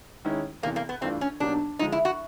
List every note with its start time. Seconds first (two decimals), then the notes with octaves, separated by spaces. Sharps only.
0.25 D#3 G#3 C#4 E4
0.63 E2 C3 E3 A#3
0.76 A#3
0.89 B3
1.01 G2 E3 A3 C4 D4 F4
1.21 C#4
1.40 B2 F#3 A#3 D4 D#4 G4
1.79 D3 F3 G#3 D#4
1.92 E4
2.05 F#4